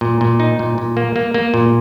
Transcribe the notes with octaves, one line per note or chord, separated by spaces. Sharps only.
A#2
A#2
D#4
A#2
A#2
A#3
A#3
A#3
A#2